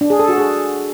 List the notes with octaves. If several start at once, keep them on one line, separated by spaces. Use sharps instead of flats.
D4
G#4
A4
F#4
G#4